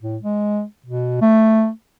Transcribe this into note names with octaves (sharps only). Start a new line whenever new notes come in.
A2
G#3
B2
A3